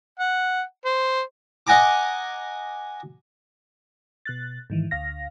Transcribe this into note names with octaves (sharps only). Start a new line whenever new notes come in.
F#5
C5
D#5 F#5 G#5 A#5 D6
B2 F#6 A6
G#2 D#3 E3
D2 F5 A#6